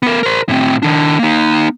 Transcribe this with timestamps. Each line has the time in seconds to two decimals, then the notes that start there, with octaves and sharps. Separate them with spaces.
0.03 B3 A#4
0.23 A#4 C5
0.49 A2 C4
0.82 D#3 D4
1.19 A#3 D#4